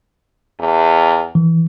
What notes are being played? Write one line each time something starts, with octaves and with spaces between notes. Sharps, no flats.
E2
E3